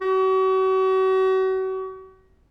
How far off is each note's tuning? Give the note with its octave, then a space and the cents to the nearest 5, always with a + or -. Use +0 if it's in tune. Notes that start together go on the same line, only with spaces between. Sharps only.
F#4 +40